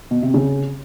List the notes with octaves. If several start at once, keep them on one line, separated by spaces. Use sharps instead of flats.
B2
C3
C#3